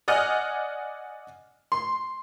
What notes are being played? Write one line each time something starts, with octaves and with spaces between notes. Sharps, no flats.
D5 D#5 F#5 G#5 F6
C6